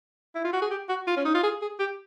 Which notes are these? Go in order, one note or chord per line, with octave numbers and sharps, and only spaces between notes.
E4
F4
F#4
G#4
G4
F#4
F4
C#4
D#4
F4
G#4
G#4
G4